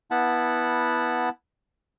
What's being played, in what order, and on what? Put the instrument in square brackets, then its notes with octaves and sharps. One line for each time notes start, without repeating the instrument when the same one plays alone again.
[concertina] B3 E4 F#5 A5 B5